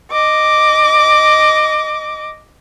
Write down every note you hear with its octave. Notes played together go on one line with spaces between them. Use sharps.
D#5 D6